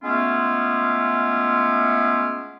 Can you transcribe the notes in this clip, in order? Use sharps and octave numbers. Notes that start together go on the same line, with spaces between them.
G#3 A3 B3 C#4 E4 F4